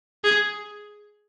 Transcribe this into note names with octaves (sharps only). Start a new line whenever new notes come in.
G#4